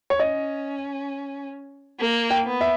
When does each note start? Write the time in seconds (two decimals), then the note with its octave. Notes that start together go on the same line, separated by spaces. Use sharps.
0.10 C#5
0.20 C#4 D#5
2.00 A#3
2.31 G5
2.46 B3
2.61 E5